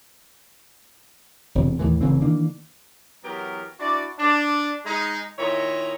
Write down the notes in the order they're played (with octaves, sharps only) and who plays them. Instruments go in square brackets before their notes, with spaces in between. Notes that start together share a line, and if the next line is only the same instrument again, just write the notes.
[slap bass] E1 C3
D#2 A2 E3
F1 C#3 E3 C4
D#3 E3 A#3 D4
[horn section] E3 F#3 B3 G4 A#4
D4 E4 F#4 D5
D4
G#3 D#4
A#2 D#3 E4 C#5 D#5 A#5